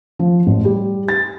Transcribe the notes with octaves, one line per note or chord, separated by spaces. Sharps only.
F3
A1
G3
A6